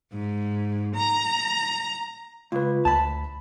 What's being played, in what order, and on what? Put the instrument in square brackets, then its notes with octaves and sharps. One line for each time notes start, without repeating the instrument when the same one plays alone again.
[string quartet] G#2
A#5
[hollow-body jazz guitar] C#2 [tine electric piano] F4 B4
[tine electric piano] D2 B5 [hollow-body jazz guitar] A5